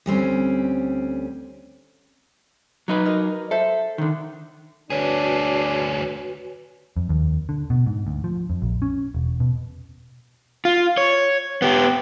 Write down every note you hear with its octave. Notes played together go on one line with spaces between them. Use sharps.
D2 G3 C4 C#4
F#3 D#4 B4
A#4 D#5
A4 C5 E5
D3 D#3
D2 D4 F#4 G#4 B4 C#5
F2
D#2
D3
B2
G#2
D2
F3
F2
A#1
C#4
E1
B2
F4
C#5
B3 G4